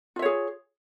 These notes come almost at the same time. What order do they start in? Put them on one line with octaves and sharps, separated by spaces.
F4 E5 C#5 G#4